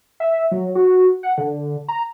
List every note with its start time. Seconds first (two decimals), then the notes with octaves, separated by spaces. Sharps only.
0.20 E5
0.52 F#3
0.75 F#4
1.23 F#5
1.38 D3
1.89 A#5